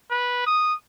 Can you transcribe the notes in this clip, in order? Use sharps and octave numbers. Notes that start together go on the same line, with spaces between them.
B4
D#6